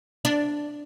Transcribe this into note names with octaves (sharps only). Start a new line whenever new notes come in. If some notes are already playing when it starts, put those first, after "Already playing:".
D4